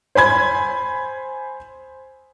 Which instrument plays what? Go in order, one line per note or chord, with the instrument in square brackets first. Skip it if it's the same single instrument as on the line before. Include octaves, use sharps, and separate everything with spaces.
[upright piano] C5 G#5 B5 G#6